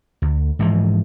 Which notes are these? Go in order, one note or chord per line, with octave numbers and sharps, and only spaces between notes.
D2
G#2 E3 F3